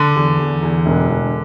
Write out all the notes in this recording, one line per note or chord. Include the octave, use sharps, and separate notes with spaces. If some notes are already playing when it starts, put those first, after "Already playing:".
Already playing: D3
E2
E2
E2
E1
E1